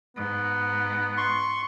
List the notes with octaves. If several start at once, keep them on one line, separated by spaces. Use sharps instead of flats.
G#2 B3
C6 C#6